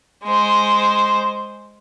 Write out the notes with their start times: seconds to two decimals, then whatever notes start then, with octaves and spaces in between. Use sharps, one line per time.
0.24 G#3 C5